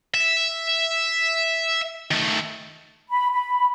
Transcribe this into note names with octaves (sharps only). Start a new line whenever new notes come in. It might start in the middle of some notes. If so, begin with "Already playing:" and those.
E5
D#3 A3
B5
B5